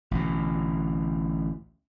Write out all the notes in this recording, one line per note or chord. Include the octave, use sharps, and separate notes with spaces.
A1 D2 B2